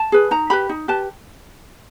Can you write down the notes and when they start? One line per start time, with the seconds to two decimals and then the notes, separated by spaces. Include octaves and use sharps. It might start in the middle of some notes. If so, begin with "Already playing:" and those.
Already playing: A5
0.12 G#4 B4
0.31 D#4 A#5
0.50 G4 B4 B5
0.69 D#4
0.88 G4 B4 A5